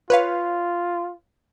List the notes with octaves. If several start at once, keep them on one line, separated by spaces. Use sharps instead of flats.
F4 B4 C#5 F5